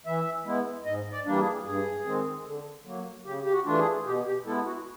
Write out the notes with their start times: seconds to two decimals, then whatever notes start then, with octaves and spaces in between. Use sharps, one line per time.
0.06 E3 E5
0.45 G#3 B3 E4
0.85 G#2 D#5
1.12 D5
1.25 E3 G3 A#3 D4
1.40 G#4
1.65 G2 G#4
2.05 D#3 G#3 C4
2.46 D3
2.86 F#3 A#3
3.25 C#3 G4
3.44 G4
3.52 F#4
3.65 E3 A3 D4 F4
3.79 G#4
4.06 B2 G4
4.26 G4
4.45 G#3 B3 E4 A4
4.65 F#4